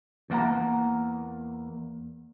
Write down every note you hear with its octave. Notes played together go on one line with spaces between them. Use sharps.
E2 A#3 F#5 A#5